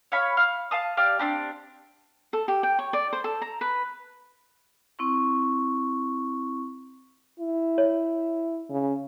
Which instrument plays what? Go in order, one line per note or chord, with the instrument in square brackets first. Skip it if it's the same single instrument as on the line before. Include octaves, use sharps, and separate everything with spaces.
[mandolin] C#5 F5 B5
F5
F5 A5 D#6
G4 D5 F5
C4 D4 G4
[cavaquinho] A4
G4
G5
C#5
D5
C5
A4
A#5
B4
[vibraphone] C4 E4 C#6
[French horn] E4
[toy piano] C#5
[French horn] C#3